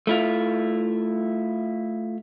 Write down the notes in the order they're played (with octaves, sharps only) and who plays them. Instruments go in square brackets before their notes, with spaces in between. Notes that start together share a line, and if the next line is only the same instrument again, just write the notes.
[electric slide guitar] A3 E4 F4